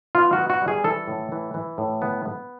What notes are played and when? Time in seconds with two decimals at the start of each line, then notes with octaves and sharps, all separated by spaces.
0.15 B3 F4
0.33 B3 F#4
0.50 F#4
0.62 G3
0.68 G#4
0.84 E3 A4
1.07 A2
1.32 E3
1.54 E3
1.78 A2
2.02 B3
2.26 B3